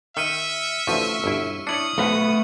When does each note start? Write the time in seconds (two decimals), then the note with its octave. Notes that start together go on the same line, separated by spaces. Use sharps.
0.17 D#3 E5 F6 C#7 D#7
0.87 A1 D2 F3 C#6 D#7
1.24 G1 B2 E4
1.67 D4 E4 C#5 D#6 C#7 F#7
1.98 B1 F3 A3 B4 F#5 A#5